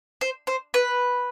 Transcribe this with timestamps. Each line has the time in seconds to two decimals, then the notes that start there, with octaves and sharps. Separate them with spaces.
0.21 C5
0.47 C5
0.74 B4